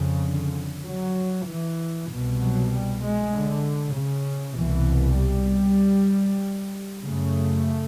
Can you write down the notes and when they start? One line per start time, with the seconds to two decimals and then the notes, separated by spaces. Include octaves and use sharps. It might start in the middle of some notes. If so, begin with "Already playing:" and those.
Already playing: F2 C#3
0.25 D3
0.85 F#3
1.47 E3
2.09 C2 B2
2.40 F#3
2.71 G3
3.01 G#3
3.33 D3
3.94 C#3
4.56 C2 B2 E3
5.18 G3
7.03 F#2 C#3 A3